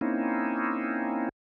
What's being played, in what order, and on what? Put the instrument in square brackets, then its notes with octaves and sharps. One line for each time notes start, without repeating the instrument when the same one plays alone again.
[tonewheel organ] A#3 C4 C#4 D#4 E4